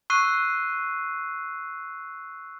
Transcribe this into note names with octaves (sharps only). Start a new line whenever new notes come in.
C#6 E6 F#6 C7 D#7